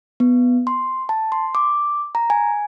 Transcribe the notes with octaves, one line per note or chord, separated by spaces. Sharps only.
B3
C6
A5
C6
D6
A#5
G#5